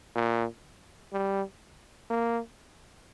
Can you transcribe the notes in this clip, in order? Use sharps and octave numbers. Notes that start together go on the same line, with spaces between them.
A#2
G3
A#3